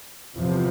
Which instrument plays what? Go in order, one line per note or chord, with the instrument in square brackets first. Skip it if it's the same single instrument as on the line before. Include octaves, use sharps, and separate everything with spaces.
[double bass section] E2 C3 F3